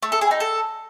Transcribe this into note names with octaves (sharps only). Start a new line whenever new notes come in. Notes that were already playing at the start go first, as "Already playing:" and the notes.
A3
A4
G#4
D#4
A4